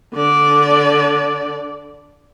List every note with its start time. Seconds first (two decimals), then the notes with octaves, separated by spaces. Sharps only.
0.14 D3 D5